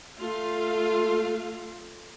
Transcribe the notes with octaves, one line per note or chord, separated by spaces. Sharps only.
A3 F4 F5